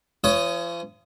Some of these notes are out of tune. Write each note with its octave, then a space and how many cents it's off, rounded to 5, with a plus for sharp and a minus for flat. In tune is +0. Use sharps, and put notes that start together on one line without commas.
F3 -40 C#5 +20 D#6 +0